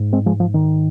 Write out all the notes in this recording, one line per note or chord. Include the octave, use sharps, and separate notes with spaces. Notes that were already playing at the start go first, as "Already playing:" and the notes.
Already playing: G#2
G#3 C4
F3 G#3
F3
D#3